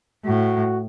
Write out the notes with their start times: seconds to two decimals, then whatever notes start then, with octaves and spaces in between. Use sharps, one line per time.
0.25 A2 F#4